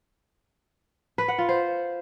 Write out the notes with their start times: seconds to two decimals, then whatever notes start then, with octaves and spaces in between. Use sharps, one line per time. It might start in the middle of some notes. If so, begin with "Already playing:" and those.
1.18 B4
1.28 F#5
1.38 F4
1.49 C5